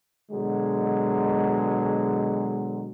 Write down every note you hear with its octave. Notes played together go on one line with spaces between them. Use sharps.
B2 D3 F#3 G#3